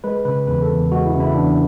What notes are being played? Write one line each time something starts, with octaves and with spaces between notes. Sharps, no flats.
G#3 B4
C#3 B4
E2 B4
A4
E2
G#3 F#4
E4
C#3
E4
E2 D4